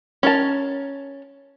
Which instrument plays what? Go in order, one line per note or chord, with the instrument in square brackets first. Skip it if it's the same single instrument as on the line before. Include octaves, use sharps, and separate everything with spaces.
[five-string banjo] C#4 A#4 A5